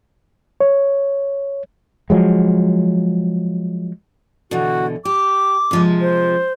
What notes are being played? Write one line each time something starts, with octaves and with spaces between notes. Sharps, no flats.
C#5
F3 F#3 G#3
B2 D3 E3 F#4
G4 D6
C3 F3 G#3
C5